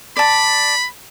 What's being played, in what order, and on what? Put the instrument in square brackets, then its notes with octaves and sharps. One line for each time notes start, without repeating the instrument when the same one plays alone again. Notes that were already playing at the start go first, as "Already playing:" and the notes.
[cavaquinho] D5 A5 [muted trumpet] B5